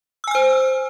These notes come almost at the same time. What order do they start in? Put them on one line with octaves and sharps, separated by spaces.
E6 G#5 F6 C5